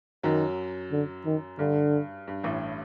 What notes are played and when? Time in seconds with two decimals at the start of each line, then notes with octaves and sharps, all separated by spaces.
0.23 F#2 D#3 F#3
0.92 D3
1.26 D#3
1.59 G2 D3
2.28 G2
2.44 A1 A2